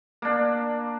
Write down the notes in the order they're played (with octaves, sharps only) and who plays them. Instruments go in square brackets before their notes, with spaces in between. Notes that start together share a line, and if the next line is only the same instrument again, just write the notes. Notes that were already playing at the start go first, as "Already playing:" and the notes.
[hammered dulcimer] A#3 D4